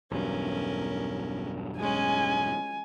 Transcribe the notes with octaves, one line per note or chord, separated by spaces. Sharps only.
B1 E2 G2 C#4 A#4
G#3 C#4 G#5